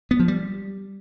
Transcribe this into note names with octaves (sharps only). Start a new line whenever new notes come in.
B3
F3
G3